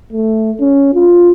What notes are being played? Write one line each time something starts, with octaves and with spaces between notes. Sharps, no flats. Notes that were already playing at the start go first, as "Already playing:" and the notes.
A3
C#4
F4